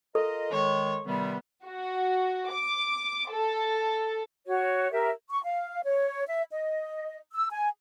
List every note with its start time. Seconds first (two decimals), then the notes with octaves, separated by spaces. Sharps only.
0.15 F4 A4 A#4 D#5
0.52 D#3 G#3 C#5
1.05 C3 D#3 G3 B3
1.66 F#4
2.51 D6
3.31 A4
4.46 F#4 C#5
4.91 G4 A#4 E5
5.29 C#6
5.43 F5
5.84 C#5
6.27 E5
6.51 D#5
7.34 E6
7.50 G#5